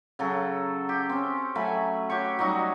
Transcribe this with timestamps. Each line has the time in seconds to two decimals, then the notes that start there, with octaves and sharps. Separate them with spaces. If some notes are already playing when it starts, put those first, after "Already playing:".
0.19 C#3 F#3 A4
0.89 G4
1.09 C4 C#4
1.55 F#3 A3 G#5 B5
2.09 F#4 G4 C#5 C#6
2.39 F#3 G3 D#4 F#4